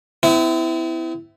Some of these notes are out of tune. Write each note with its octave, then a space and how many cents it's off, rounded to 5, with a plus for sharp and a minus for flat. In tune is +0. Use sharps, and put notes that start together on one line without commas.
C4 -45 E4 +0